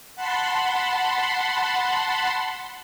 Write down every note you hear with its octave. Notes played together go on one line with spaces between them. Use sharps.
F#5 A5 B5 C6